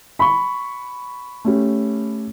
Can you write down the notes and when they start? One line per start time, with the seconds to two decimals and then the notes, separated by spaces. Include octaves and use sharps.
0.19 B5 C#6
1.45 A3 C#4 G4